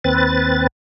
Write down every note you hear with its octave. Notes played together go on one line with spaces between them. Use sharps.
D#2 C4 B4 A6